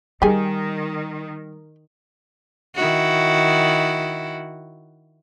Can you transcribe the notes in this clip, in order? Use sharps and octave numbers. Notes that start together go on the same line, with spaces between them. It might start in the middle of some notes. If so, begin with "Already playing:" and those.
D#3 G3 G4 G#4
D#3 E4 F#4